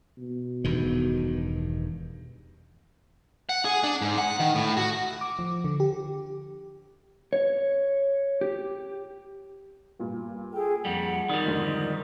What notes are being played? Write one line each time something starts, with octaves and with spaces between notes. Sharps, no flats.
B2
E1 G2 D#3
F#5
G#4
D4
G#2
F#5
D#3
A2
F#4
D6
F3
D3
G4
C#5
G4
G2 A#2
G#4 A4 G5
F2 G3 F#5
D#3 G3 A#4 D5 D#6
F2 G#2 D3